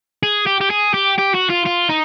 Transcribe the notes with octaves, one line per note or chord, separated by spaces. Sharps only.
G#4
G4
G4
G#4
G4
G4
F#4
F4
F4
D#4